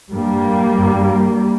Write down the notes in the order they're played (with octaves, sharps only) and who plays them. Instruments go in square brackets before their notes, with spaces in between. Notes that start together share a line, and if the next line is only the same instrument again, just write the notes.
[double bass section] G2 G3 A#3
G2